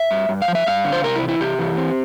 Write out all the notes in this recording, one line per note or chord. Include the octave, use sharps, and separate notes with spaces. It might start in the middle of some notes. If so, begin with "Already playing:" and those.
Already playing: E5
G2
G2
F5
F3
E5
G2 F5
D3
C5
C3 A#4
E4
E3
E4
C3 G4
E3
C4